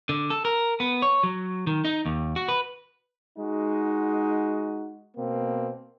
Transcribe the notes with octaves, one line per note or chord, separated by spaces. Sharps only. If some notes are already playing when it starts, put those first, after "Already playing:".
D3
A4
A#4
B3
C#5
F#3
D#3
D#4
D#2
F#4
B4
G#3 D#4 F#4
B2 A#3 C4